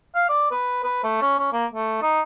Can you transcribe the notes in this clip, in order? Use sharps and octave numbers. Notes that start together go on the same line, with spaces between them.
F5
D5
B4
B4
A3
C#4
C#4
A#3
A3
D#4